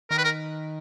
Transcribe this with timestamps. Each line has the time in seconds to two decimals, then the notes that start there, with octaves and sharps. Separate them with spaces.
0.11 D#3 A#4
0.18 B4
0.25 A#4